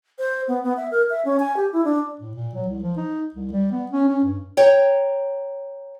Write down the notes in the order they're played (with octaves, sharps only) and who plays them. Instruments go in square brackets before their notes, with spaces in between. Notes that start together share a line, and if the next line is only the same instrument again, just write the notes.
[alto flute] C5
B3
B3
E5
A#4
E5
C#4
G#5
G4
E4
D4
[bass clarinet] A2
A#2
F#3
C2
F3
D#4
C2
G3
B3
C#4
C#4
G2
[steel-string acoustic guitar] C#5 G5 A#5